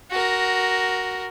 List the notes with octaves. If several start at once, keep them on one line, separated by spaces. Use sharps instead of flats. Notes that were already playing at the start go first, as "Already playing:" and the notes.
F#4 A#4